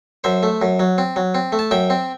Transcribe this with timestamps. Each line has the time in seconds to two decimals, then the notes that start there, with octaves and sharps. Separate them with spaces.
0.24 F#2 C5 E5
0.43 A3
0.62 F#2
0.79 F#3
0.98 C4
1.16 F#3
1.35 C4
1.52 A3
1.59 A5
1.71 F#2 E5 G5
1.90 C4